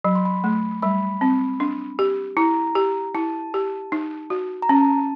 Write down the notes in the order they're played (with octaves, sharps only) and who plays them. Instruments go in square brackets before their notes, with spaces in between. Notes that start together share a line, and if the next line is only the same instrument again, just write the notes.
[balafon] F#3 [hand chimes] B5
[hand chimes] C6
B5
[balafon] A3
[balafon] G3 [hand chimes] B5
[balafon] C4
D4
G4
[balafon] E4 [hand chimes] A#5
[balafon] G4
[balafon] E4 [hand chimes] A5
[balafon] G4
D#4
F#4
[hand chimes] A#5
[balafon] C#4 [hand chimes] A5